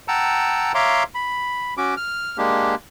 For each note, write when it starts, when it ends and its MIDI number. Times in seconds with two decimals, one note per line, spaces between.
0.08 0.72 78
0.08 0.72 79
0.08 0.72 81
0.08 0.72 82
0.08 0.72 88
0.75 1.03 73
0.75 1.03 76
0.75 1.03 77
0.75 1.03 82
0.75 1.03 84
0.75 1.03 86
1.15 1.74 83
1.77 1.94 61
1.77 1.94 66
1.77 1.94 86
1.97 2.37 89
2.38 2.75 56
2.38 2.75 58
2.38 2.75 62
2.38 2.75 67